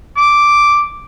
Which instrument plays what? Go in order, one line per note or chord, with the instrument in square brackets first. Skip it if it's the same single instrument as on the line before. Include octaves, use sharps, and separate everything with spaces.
[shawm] D6